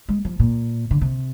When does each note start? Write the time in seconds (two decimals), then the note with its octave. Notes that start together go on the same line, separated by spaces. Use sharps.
0.09 G#3
0.25 F3
0.39 A#2
0.91 D3
1.01 C3